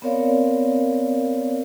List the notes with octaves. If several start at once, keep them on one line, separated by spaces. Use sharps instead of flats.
B3 C4 A#4 C#5 D5 F5